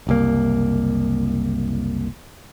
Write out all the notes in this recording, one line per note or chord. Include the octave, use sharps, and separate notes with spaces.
F#1 C2 A#3